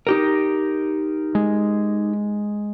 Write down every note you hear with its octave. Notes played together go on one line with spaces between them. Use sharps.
D#4 G4 A#4
G#3